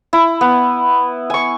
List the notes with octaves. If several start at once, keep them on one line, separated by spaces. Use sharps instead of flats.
E4
B3
G#5 C#6